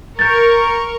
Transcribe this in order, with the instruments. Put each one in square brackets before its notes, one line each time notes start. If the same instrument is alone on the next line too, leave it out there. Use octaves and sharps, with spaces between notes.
[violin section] A#4 C#6 [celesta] G6 A6